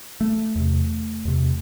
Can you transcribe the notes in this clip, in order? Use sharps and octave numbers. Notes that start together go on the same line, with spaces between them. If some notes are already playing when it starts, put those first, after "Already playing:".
A3
E2 C3
E2 C3